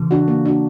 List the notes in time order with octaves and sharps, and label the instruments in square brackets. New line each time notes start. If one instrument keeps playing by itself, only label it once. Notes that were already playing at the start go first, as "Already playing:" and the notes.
Already playing: [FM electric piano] C#3 E3
[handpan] D4 F#4
A#3
D4 F#4